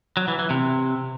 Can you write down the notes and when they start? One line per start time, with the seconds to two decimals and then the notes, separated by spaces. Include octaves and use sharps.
0.17 F#3
0.28 E3
0.39 E3
0.50 C3